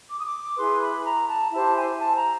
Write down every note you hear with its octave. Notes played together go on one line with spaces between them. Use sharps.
D6
D#6
D6
E4 G#4 B4 C6
B5
A#5
A5
E4 G4 C5 A5
G#5
A5
A#5